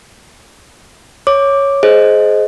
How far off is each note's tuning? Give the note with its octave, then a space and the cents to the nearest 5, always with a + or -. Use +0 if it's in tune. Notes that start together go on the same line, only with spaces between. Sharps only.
C#5 +0 D6 +0
G#4 +25 C5 +0 D#5 +0